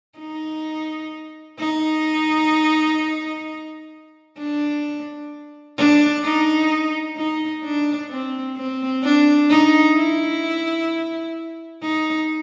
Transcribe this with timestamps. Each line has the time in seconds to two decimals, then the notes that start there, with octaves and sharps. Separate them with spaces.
0.19 D#4
1.59 D#4
4.38 D4
5.78 D4
6.24 D#4
7.17 D#4
7.64 D4
8.10 C4
8.57 C4
9.03 D4
9.50 D#4
9.96 E4
11.82 D#4